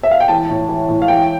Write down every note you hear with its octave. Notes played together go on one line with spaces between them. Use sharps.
E5
F5
G5
E3 A5
A2
E3
A2
F5
E3 G5